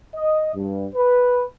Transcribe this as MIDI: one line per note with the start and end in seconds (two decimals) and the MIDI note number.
0.15 0.51 75
0.55 0.86 43
0.95 1.44 71